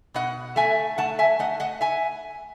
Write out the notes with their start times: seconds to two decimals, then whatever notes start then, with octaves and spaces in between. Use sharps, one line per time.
0.14 B2 D#5 F#5
0.56 A3 E5 G#5
0.98 A3 F#5 A5
1.19 E5 G#5
1.39 A3 D#5 F#5
1.60 D#5 F#5
1.81 E5 G#5